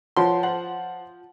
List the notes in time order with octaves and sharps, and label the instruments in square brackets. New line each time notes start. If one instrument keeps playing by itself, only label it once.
[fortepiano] F3 C6 [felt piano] B4 [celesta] C#5 F#5 A5
[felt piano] C5 F#5 A5 [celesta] F#7